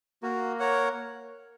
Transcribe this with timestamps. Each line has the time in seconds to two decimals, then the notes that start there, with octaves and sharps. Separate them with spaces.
0.23 A#3 F#4
0.59 A#4 C#5 F#5